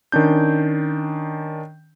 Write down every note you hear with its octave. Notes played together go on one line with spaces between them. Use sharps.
D#3 C#4 D4 G6